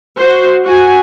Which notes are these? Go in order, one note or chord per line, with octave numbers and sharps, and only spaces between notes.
F#4 C5
F#4 G#5